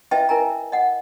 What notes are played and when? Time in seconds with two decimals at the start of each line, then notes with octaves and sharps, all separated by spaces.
0.11 E4 B4 D#5 E5 G5 A5
0.29 E4 A#4 G#5 A#5
0.72 D#5 F#5